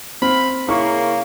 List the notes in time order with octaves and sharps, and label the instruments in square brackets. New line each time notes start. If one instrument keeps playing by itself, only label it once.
[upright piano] C4 [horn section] F5 B5
[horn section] C#3 [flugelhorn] A#3 [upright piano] E4 A#4 C#6